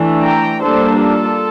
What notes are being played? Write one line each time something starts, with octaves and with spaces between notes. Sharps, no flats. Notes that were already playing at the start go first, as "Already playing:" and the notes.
Already playing: E3 A3 D4
G5 A#5
G3 A#3 D4 A4 C5
F4 A4